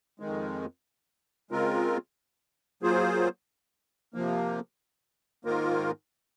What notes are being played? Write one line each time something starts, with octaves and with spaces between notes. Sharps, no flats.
F2 D#3 G#3
C#3 G#3 C4 F4 A#4
F#3 A#3 F4 G#4 C5
C3 F3 A#3
G#2 D#3 A#3 F4 A#4